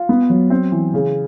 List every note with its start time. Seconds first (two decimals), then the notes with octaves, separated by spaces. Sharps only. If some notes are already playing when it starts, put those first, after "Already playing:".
Already playing: F4
0.09 B3
0.30 F#3
0.50 C4
0.72 E3
0.94 C#3